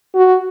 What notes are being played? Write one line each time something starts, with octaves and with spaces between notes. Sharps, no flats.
F#4